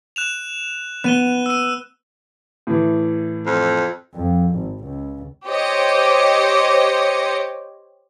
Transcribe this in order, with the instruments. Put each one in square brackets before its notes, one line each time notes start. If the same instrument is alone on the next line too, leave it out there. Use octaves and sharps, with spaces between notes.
[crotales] F#6 E7 F7
[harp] B3 [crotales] F#6 D#7 G7
[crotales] E6 D#7
[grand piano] A2 E3
[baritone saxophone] F2
[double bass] F2
G#1
C#2
[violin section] G4 C5 C#5 D#5 C#7